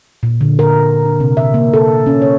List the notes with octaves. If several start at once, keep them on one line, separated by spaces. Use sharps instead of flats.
A#2
D3
A#4
D4
C3
E5
A#3
A4
C#4
C#5